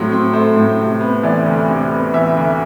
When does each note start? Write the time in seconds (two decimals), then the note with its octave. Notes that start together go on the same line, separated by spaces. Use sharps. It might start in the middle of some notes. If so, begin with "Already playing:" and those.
Already playing: A2 F#3 C4
0.12 C4
0.33 A3 C5
0.56 A2
0.80 C3
1.01 B3
1.23 E3 D5
1.46 D2
1.68 C3
1.91 B3
2.14 E3 E5
2.37 D2